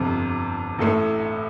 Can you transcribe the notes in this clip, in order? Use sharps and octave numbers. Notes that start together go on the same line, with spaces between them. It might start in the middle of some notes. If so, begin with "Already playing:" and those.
Already playing: G1 F2 C3
A1 A2 A3